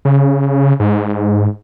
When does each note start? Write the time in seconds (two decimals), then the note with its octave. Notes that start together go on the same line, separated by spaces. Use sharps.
0.05 C#3
0.80 G#2